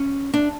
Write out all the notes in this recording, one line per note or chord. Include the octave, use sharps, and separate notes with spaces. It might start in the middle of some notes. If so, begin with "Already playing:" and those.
Already playing: C#4
D4